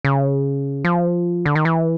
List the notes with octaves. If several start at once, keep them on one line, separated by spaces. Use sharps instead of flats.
C#3
F3
D3
D#3
E3